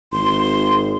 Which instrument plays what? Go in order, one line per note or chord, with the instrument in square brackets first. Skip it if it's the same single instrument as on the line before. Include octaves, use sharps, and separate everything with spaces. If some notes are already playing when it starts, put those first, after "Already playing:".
[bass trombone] G#1 [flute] C6